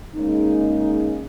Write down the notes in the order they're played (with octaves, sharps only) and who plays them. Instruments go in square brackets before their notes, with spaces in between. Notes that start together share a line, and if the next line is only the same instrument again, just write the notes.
[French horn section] C#3 G#3 A#3 D#4